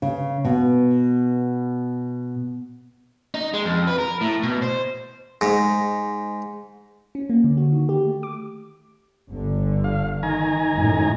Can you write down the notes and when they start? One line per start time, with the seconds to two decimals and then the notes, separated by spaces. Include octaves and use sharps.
0.02 C#3
0.45 B2
3.34 D#4
3.54 G#3
3.65 F2
3.87 B4
3.98 A#4
4.21 A2
4.43 B2
4.62 C5
5.41 G#2
7.15 C#4
7.30 A#3
7.44 D3
7.57 F#4
7.72 D#3
7.89 G4
8.05 A3
8.23 D6
9.30 G1 D3
9.84 F5
10.23 D#3 G#5 A#5
10.73 G#1 F#2 A2